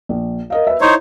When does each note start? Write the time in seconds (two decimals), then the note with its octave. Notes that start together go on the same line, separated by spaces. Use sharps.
0.09 A#1
0.50 A#4 D#5 F5
0.67 B4 E5
0.81 D#4 E4 C5 C#5